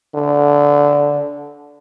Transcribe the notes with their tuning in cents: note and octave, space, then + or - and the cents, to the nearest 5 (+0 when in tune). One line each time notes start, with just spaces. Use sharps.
D3 -15